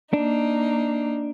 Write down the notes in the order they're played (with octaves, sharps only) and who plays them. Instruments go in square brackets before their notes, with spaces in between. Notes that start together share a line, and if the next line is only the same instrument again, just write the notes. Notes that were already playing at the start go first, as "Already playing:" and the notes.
[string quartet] A#3 D#4 [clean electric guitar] D4